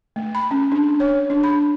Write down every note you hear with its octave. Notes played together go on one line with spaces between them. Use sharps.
A3
B5
C#4
D4
C#5
D4
B5